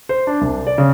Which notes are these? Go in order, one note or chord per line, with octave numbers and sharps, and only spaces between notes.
C5
D4
C2
D5
C#3